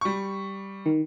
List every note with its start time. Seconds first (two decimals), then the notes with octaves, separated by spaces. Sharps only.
0.01 G3 C#6
0.86 D#3